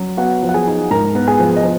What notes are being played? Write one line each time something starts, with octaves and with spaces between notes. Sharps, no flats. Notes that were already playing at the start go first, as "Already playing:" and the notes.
Already playing: F#3 C#4
B3 F#4 F#5
F3
F#5
G#4 G#5
D#4
G#2 A#4 A#5
B3
G#4 G#5
F3
D#5
F3